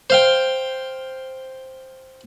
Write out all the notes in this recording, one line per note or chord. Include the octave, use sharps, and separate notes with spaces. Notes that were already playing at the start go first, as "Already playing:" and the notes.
C5 F5 G5